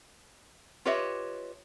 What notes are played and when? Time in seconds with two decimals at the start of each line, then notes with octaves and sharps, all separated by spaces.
0.85 F4 G4 B4 C#5 D#5 E5